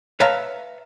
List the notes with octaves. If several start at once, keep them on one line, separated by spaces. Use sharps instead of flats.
B4 C#5 E5 F5 A5 A#5